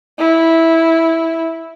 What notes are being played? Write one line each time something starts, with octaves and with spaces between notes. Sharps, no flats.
E4